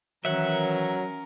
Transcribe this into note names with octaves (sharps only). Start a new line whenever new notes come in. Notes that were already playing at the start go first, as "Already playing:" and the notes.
D#3 E3 F#3 C#4 A#4 E5 F#5